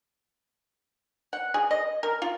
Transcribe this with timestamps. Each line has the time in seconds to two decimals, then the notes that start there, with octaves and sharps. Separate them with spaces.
1.33 F#5
1.54 G#4
1.71 D#5
2.03 A#4
2.22 F4